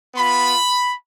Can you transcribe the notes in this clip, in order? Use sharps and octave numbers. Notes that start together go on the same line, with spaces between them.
B3 F4 B5